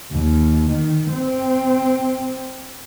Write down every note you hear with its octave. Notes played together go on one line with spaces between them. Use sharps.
D#2
D#3
C4